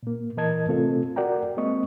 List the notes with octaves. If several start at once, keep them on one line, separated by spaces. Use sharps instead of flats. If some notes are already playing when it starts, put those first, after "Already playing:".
A#2 A#3
A#2 E3 A#4 D#5 A5 G#6
C3 A3 C4 F4 A4
F#4 A#4 D5 F#5 G5 A#5
G#3 A#3 C4 D#5 C#6